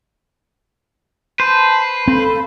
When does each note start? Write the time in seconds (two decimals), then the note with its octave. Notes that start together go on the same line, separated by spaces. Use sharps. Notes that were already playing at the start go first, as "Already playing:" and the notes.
1.40 B4 C5 A5
2.08 C4 A4 F5 B5